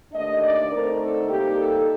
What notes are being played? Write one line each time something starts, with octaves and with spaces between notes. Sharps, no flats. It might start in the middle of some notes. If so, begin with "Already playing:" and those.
D#2 D3 A3 D4 D#5
D5
D3 A3 C4 D#4 A#4
A4
C3 G3 A#3 D#4 G4
A4